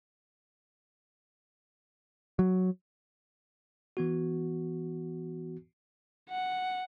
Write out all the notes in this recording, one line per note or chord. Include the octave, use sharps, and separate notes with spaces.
F#3
E3 B3 F#4
F#5